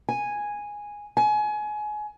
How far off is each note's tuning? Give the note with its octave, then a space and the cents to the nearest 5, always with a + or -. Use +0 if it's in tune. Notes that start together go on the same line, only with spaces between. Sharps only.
G#5 -5
G#5 +25